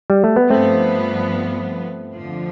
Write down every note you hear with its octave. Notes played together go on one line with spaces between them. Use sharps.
G3
A3
B3
G2 F3 A3 B3 C4
F2 D3 F3